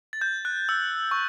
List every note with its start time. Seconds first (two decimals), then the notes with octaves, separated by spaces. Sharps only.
0.13 A6
0.21 G6
0.45 F#6
0.69 E6
1.11 C#6